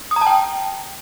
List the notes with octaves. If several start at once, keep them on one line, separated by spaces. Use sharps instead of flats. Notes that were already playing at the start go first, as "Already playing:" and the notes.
D#6
A#5
A5
G5